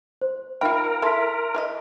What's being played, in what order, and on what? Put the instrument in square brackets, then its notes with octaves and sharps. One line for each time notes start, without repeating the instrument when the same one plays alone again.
[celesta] C5
[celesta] D#4 E5 B5 [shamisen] F4 G5 [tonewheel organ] A#4
[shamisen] E4 A4 [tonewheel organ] A#4 [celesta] C6 B6
[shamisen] E3 F4 D#5